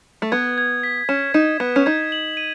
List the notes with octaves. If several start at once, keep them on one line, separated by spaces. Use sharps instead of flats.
A3
B3 G#6
G#6
B6
C#4 E7
D#4 E7
B3 G#6
C#4
D#4 G#6
F#7
D#7